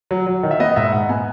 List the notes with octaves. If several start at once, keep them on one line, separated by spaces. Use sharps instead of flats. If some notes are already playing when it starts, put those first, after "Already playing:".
F#3
F#3
D#3
E5
B3 D#5
G#2 E5
G#2 F#5
B3 G#5